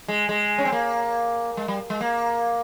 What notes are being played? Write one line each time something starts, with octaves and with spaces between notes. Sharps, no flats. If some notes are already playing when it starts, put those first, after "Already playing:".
G#3
G#3
C#4
C4
A#3
G#3
G3
G#3
A#3